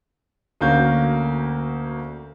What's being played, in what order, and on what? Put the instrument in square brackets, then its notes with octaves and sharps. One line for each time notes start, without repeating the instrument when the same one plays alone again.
[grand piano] D2 A#3 C#4 F#4 G6